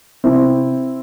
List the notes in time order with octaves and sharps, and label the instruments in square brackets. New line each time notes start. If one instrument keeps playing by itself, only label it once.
[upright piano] C3 C4 E4